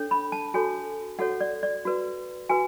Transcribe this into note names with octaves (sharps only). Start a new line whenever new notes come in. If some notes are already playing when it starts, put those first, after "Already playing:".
Already playing: D4 A4 C#5
B5
A5
F#4 A4 C#5 G#5
F#4 A4 C#5 F#5
D5
D5
F#4 B4
F#4 B4 G#5